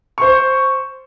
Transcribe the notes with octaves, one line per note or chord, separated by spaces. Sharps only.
C5 C#6